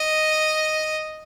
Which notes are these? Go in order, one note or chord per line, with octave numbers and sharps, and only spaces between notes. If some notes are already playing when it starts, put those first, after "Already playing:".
Already playing: D#5